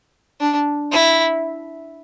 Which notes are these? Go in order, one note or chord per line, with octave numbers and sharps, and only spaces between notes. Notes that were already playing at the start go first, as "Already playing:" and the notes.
D4
E4